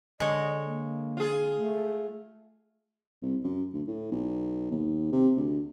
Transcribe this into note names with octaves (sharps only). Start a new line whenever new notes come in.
D3 G#3 C#5 D#5
A#3
F4 G#4
A3
C2
F#2
D2
A2
B1
D#2
C3
D2